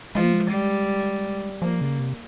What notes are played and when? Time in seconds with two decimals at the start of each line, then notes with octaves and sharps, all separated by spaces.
0.15 F3 G#3
0.24 A#3
0.33 G#3
0.51 G3
1.62 F3 A#3
1.81 C#3
1.99 C3